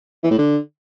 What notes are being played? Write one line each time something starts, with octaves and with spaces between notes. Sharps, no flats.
E3
A2
D3